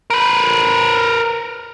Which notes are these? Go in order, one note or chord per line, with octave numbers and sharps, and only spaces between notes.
A#4 B4